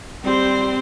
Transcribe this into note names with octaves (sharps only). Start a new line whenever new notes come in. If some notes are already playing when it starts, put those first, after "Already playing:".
G3 C4 G4 C5 G5